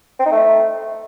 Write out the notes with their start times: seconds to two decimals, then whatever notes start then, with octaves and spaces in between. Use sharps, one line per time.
0.19 C4
0.26 D#4
0.32 A3